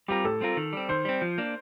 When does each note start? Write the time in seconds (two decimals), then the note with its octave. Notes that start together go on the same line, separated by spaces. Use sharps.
0.08 G3 C4 F4 G4 A#4
0.24 A2 A4
0.41 G3 C4 F4 A#4
0.57 D#3
0.73 G3 C4
0.89 D#3 C5
1.05 G3 C4
1.22 F3
1.38 A#3 D4